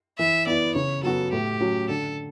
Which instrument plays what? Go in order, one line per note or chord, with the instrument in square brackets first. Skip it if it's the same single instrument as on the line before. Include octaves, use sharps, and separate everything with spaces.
[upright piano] E3 [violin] E5
[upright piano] B3 E4 [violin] D5
[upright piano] C#3 [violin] C#5
[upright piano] F#3 B3 F#4 [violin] A4
[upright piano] A2 [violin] G4
[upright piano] F#3 C#4 F#4
[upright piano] D3 [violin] A4